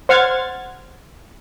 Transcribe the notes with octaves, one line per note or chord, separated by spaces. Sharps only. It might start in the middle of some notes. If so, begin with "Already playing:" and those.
C5 F#5 F6 G#6 A6